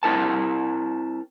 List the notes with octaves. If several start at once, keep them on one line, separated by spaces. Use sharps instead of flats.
C4 E4 A#4 A5